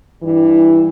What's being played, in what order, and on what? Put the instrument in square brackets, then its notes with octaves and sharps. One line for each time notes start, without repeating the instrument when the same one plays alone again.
[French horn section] G2 E3 G3